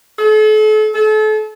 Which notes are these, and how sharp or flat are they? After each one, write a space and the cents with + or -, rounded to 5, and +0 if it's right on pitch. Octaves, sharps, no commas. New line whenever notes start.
A4 -40
A4 -35